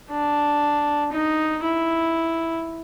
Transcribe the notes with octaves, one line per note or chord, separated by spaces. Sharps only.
D4
D#4
E4